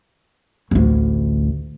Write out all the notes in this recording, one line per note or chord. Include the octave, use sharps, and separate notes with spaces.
A1 D2